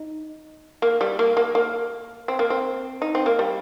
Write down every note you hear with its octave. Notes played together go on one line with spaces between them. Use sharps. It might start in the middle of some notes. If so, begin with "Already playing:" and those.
Already playing: D#4
A#3
G3
A#3
A#3
A#3
C4
A#3
C4
D#4
C4
A#3
G3